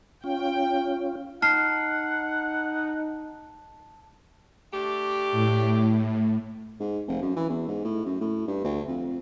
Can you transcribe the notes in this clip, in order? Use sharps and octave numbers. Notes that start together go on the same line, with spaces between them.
C#4 F4 G5
D#4 F#5 A5 F6 C7
A3 D4 G4
A2
G#2
F1
F#2
E3
E2
G#2
A2
F#2
A2
G2
D2
F2